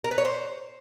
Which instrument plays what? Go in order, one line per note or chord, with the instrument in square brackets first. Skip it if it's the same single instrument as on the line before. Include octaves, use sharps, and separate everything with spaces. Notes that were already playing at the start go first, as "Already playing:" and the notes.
[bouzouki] A#4
B4
C#5
C5